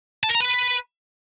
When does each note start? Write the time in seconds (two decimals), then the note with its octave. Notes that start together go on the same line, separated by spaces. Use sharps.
0.23 A5
0.29 A#4
0.35 A#5
0.41 B4